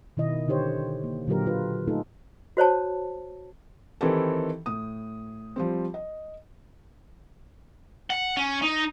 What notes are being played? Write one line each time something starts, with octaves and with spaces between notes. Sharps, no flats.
B2 D#3 E4 D#5
D3 D#4 G4 C5 C#5
A#3
A#2 D3 F#3 F4 G4 A#4
F4 B4
A3 D#4 F4 G#4 A4
F#4 C5 C#5 A5
D#3 E3 C4 E4 G4 A4
A2 D#6
F3 G3 C4
D#5
F#5
C#4
D#4